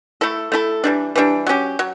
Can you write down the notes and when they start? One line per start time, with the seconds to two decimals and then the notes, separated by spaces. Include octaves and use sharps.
0.21 A3 E4 A4
0.52 A3 E4 A4
0.84 E3 G3 D4
1.16 E3 G3 D4
1.47 F#3 C#4 G4
1.79 F#3